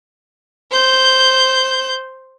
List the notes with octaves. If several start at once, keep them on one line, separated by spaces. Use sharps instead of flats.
C5 G6